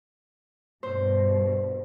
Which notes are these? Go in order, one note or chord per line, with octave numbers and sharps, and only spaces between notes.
G2 B2 C5